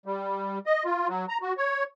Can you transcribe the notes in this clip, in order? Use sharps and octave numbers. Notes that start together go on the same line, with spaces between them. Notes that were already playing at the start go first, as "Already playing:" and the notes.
G3
D#5
F4
F#3
A#5
F#4
C#5